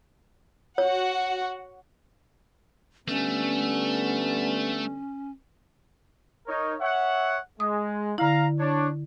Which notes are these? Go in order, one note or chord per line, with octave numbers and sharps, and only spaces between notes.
F#4 C#5 F#5
D3 G3 A3 B3 C#4
D#4 A#4 C#5
C#5 E5 F#5
G#3 D#6
D3 E4 F5 A#5
D4 C#5